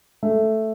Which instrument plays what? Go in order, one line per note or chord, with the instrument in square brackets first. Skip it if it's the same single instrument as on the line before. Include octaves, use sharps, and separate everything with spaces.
[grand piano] A3